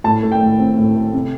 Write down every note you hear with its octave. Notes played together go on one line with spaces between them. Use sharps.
A2 A5
A3
G5
A2
C4
A2
A3
C3